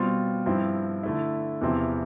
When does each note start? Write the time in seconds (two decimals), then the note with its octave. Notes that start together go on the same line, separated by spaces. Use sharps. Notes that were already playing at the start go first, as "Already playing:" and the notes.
Already playing: B2 G3 C4 F4
0.46 G2 F3 C4 E4
1.03 D3 A3 E4
1.61 E2 C3 F3 C4 E4